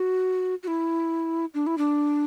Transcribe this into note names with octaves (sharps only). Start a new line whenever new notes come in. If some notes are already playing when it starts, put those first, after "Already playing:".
Already playing: F#4
F#4
E4
D4
E4
D4